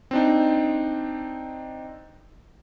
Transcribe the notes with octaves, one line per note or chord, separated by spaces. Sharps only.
C4 D4 D#4